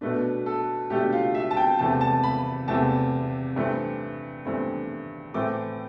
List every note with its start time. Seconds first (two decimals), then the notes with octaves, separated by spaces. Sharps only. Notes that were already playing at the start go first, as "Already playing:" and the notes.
0.01 B2 A3 D4 B4
0.46 A4
0.90 B2 A3 D4 G4
1.13 F4
1.35 E5
1.51 A5
1.57 G5
1.79 E2 C3 E3 A3 A5
2.01 A5
2.24 B5
2.68 E2 C3 E3 A3 A5
3.56 G2 E3 A3 C4
4.45 G2 E3 A3 C4
5.34 A2 E3 A3 C4 D6